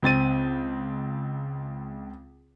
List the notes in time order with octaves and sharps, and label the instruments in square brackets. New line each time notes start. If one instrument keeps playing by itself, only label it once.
[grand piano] C#2 C4 A6 D#7